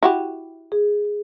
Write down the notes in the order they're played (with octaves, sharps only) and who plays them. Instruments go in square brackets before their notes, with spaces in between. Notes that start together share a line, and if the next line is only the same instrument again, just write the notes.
[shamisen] E4 F#4 G4
[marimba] G#4